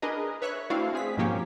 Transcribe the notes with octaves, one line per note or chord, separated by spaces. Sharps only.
D4 G#4 A#4 B4 D#5
B4 C#5 E5 C#6 F#6
A3 C4 D4 E4 F#4 F5
C4 G#4 B6
G#2 B2 F3 A#3 C#4 G4